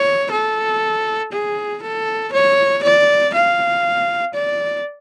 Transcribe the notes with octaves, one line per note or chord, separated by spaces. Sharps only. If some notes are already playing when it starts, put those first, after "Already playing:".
Already playing: C#5
A4
G#4
A4
C#5
D5
F5
D5